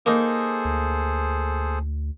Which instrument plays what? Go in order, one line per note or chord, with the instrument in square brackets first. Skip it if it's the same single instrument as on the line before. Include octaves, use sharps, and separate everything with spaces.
[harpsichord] A#3 D#4 [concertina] G#4 A4 C5
[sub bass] D2